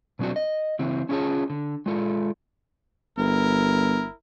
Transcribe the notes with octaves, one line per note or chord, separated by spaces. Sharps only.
B2 F#3 C4 D4 F#4
D#5
C#3 E3 C4
C#4 D4 F4 G#4 C#5 A5
D3
G#3 F4 A4
G1 E4 A#4